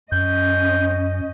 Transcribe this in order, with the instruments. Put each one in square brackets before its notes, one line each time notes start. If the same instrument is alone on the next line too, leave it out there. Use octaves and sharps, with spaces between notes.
[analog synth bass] F#2 [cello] C#4 D#5 [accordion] G6